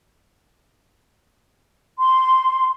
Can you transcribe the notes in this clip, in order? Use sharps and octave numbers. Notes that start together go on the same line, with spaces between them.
C6